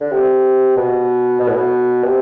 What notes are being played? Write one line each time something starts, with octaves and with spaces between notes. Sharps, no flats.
D3
C3
B2
B2
A2
B2
C3